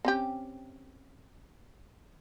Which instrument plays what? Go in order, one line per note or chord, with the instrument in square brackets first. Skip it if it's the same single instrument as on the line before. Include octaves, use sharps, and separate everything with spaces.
[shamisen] C4 C#4 G4